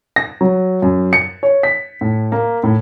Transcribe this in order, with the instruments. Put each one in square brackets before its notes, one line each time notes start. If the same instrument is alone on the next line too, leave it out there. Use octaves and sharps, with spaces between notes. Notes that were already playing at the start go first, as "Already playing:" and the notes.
[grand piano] A#6
F#3
F#2
C#7
C#5
B6
A2
A#3
A2